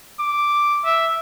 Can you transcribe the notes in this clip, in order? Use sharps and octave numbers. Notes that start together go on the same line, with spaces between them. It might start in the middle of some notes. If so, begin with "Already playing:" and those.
D6
E5